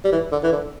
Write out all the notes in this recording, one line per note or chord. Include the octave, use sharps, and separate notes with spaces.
G3
E3
D3
E3
D3